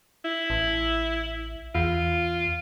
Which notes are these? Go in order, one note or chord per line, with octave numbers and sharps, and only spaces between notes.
E4
A1
E2 F4